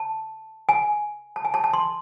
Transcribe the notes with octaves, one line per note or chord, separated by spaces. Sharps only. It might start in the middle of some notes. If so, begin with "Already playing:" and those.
Already playing: A5
G#5
A5
G#5
A5
A5
C6